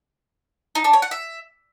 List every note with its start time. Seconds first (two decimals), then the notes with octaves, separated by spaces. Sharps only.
0.75 D#4
0.84 D4
0.93 C#5
1.02 F#5
1.11 E5